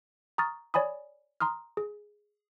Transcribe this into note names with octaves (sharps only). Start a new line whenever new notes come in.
A#5 C#6 D#6 F6 A6
C#5 D5 G#5 B5 D#6
A#5 C6 D#6 F6
G#4